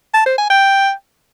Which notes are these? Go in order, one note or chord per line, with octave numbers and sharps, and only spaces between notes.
A5
C5
G#5
G5